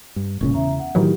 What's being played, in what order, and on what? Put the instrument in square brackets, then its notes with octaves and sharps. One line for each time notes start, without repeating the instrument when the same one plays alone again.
[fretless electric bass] G2
[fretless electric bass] E1 A#2 C#3 [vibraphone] C#4
[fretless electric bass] E2 C#3 [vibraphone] E5 A#5
[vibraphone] F#5
[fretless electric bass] A2 D#3 [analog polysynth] E3 F#3 [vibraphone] G4